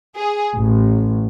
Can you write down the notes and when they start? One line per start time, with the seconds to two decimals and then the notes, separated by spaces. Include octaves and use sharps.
0.15 G#4
0.54 A1